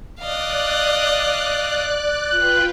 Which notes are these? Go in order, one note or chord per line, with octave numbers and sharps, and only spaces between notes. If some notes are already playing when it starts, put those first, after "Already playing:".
D5 D#5 F5 F#6
F4 B4 G5 F#6